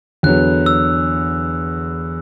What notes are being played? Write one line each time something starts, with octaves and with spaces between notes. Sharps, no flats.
E2 D3 F#3 B3 F#6
E6